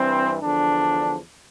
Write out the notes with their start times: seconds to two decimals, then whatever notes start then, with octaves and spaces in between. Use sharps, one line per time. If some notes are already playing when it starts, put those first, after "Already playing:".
Already playing: G2 E3 C4
0.41 E2 D3 F3 D4